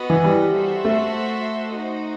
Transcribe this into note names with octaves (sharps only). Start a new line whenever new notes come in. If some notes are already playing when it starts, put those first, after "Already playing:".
Already playing: B3 F#4 B4 D#5
E3
G3
F#4 A4 C5 E5 A5
A3
D#4 F#4 C5 D#5